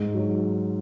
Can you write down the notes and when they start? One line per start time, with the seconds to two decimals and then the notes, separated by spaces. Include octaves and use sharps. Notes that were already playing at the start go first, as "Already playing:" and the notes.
Already playing: G#2
0.15 F#3